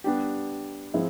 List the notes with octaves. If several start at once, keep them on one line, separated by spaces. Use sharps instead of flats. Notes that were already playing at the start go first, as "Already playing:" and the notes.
G3 B3 D4 G4
F3 G#3 C4 E4